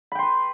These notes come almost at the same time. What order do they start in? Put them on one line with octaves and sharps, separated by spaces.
B5 G5 C6 B4